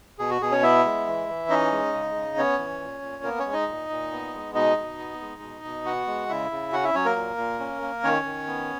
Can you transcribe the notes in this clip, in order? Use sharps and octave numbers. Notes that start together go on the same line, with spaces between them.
B2 G#4
F#4
B2 G#4
C#4 C#5
B3 E4 E5
G#3
E3
E3
C#4 D#4 D#5
G#3
C#3
C#3
B3 C#4 C#5
E3
A#2
A#2
A#3 B3 A#4
C#4 C#5
G#3
D#4 D#5
A#2
A#2
B3
G#3
B2 D#4 D#5
B2
B3
G#3
B2
B2
B3 F#4 F#5
G#3
C#3 E4 E5
C#3
C#4 F#4 F#5
E4 E5
F#3 C#4 C#5
A#3 A#4
A#2
A#2
C#4
A#3
D#3 C#4 C#5
D#3
B3